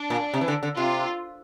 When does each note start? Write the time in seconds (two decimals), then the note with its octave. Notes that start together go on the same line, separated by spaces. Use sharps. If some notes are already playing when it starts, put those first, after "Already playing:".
Already playing: D4
0.10 A#2
0.33 C3
0.41 E3
0.48 D3
0.63 D3
0.77 C3 F4